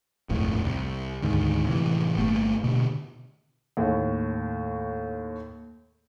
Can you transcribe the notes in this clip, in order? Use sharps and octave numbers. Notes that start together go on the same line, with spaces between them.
D#1 G#1 F2 A2
C2
D2 G#2 D#3
A2 C3 E3
G1 A3 A#3
B2 D3
D#2 A2